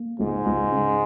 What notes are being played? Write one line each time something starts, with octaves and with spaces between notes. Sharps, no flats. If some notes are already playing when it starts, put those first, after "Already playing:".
Already playing: A#3
C#2 G#2
C#2
C#3